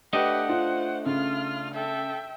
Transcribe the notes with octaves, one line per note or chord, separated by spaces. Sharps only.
A3 D4 G4 B4 D#5 F#5
F4 C5
C#3 F4 F6
A4 E5 G5